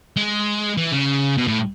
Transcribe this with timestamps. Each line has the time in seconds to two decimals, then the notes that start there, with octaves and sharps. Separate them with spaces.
0.16 G#3
0.77 E3
0.92 C#3
1.38 B2
1.48 A2